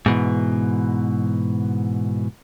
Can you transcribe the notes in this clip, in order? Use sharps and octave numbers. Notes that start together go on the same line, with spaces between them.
G#2 B2 E3